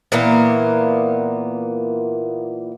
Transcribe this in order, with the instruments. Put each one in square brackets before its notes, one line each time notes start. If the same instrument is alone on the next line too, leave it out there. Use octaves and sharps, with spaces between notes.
[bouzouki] A#2 E3 A#3 B3